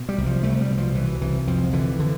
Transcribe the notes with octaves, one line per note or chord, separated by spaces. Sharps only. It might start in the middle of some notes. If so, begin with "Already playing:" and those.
Already playing: B2
G3
C2
F3
C2 A3
G3
B2
F3
B2 E3
C2 E3
F2 F3
D3 E3
D3